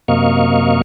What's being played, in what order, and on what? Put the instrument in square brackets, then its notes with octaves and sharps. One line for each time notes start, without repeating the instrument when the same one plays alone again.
[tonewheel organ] F#2 C3 A#3 D#5 F5 C#6